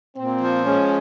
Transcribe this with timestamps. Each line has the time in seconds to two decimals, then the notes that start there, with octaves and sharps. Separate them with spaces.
0.16 A#2 C4
0.41 F3
0.65 G#3 C#4